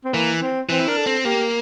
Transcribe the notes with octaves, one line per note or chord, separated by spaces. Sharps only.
C4
E3 A#3
C4
E3 C4
E4
D4 A#4
A4
C4
A#3 G4